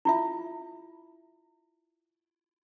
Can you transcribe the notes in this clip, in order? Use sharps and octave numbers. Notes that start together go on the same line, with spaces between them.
E4 F4 E5